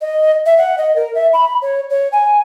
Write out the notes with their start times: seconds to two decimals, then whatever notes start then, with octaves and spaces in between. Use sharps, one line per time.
0.01 D#5
0.46 E5
0.58 F#5
0.78 D#5
0.96 A#4
1.14 E5
1.33 B5
1.62 C#5
1.90 C#5
2.12 G#5